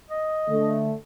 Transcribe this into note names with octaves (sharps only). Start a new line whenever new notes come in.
D#5
D3 A3